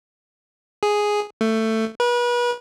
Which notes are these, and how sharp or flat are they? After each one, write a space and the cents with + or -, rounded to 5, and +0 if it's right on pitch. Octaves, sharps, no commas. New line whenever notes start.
G#4 +0
A3 +15
B4 -35